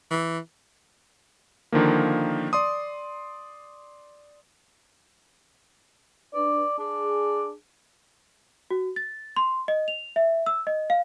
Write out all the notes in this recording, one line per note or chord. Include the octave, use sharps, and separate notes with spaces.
E3
D3 D#3 F3 A#3
D5 C6 D#6
D4 B4 D5
D4 G#4
F#4
A6
C6
D#5
F7
E5
E6
D#5
F5